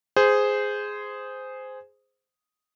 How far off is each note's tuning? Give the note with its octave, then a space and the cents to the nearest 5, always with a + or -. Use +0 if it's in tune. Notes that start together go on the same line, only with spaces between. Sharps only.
G#4 +0 C5 -15